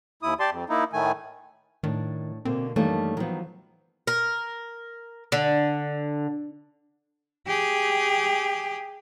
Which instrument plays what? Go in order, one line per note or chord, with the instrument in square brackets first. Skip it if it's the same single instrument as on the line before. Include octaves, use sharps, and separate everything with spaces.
[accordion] D#2 E4 D#6
G4 D5 A5 C6
F2
A#3 D#4 E4
A2 D#3 A3 G#5
[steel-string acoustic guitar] A2 [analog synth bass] D#3 [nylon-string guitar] D4
[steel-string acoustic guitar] B2 D3 A#3 [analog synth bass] C4
[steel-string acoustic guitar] F#2 D#3 G3 [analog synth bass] E3 [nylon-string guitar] A3 A#3 D4
[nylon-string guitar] D#3 B3 [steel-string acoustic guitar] F3 F#3
[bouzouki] A#4
D3
[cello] G4 G#4